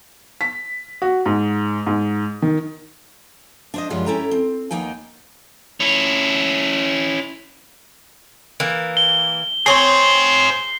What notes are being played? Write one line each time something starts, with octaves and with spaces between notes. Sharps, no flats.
B6
F#4
G#2
G#2
D#3
D4 C5 D#5
F#2 F3 G3 G#3 F4
C#4 E4 A4 G5 A#5
C4
D#2 A#3 B3 D#4 G5 G#5
C#4 E4
E3 A#3
G7
C4 G#4 C5 C#5 C7